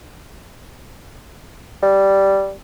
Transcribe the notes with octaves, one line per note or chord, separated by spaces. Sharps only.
G3